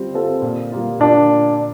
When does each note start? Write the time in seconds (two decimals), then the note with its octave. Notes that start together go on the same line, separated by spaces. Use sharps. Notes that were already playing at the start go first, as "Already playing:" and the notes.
Already playing: G3 C4 F4 C5
0.14 C4 F4 A4 C5
0.42 A#2
0.72 G3 A#3 F4
1.00 A#2 D4